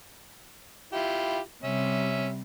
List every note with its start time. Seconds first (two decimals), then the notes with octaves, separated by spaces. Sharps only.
0.93 E4 F4 G4
1.64 C3 G3 C#4 E5